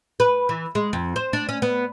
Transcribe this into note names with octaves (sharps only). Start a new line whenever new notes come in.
B4
E3
G#3
F2
C5
D4
C#4
B3